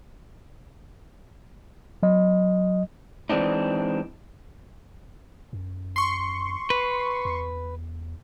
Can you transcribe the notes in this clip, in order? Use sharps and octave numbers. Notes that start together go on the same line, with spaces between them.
F#3 D#5
E3 G#3 C4 D4 D#4
F#2
C6 C#6
B4
E2